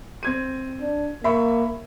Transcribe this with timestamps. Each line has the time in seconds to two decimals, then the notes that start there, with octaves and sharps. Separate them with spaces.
0.23 C4 G#6 D#7
0.81 D4
1.24 A#3 E5 B5 C#6